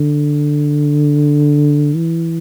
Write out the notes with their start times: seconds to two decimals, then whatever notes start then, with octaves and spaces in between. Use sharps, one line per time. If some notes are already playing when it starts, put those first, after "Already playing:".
Already playing: D3
1.96 E3